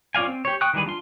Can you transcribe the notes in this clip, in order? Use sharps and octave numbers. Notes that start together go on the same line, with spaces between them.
C#4 F4 D5 F5 G#5
C4
G4 C#5
G5 C#6 D#6 F#6
D#3 E3 G3 G#4 B4
D4 F4 C6